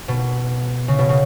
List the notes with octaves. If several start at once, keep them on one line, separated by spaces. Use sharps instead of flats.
B2
C#3
B2
C#3